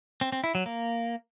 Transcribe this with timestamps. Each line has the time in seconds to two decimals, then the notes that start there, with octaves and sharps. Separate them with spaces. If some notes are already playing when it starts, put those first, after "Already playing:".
0.21 C4
0.32 C4
0.44 E4
0.55 F#3
0.66 A#3